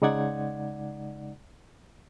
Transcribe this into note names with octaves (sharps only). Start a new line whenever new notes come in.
C#3 G#3 D#4 D5 F#5 G#6